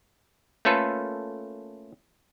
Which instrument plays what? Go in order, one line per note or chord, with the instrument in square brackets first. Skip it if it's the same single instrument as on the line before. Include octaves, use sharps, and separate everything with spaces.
[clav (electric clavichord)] A3 A#3 C#4 F4 A4 B4